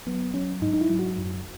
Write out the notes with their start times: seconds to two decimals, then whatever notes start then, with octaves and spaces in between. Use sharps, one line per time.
0.07 F#3 B3
0.34 F#3 C#4
0.62 G#2 D#4
0.73 D#4
0.81 E4
0.90 F#3
0.99 F#4
1.18 F#2